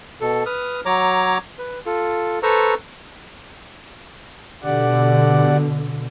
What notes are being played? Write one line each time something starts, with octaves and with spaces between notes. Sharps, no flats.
B2 A4
B4 D#6 F6
F#3 C#5 A#5 D6
B4
F4 A4
A4 B4 C5 A#5 C#6 E6
B2 D3 G4 D5 F#5